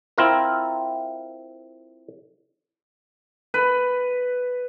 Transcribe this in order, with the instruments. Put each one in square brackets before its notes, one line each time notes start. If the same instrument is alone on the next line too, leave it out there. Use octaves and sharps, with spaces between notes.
[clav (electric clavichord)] C4 E4 F4 A#4
[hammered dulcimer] B4